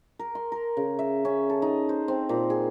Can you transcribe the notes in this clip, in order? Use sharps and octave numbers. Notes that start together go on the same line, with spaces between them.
A#4
C6
A#4
C#3
E5
C#4
A4
D#4
C5
C4
A#2
G#4